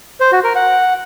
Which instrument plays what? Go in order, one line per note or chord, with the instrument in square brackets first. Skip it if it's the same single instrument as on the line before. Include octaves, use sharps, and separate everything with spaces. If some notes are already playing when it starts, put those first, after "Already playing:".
[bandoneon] C5
F#4
A#4
F#5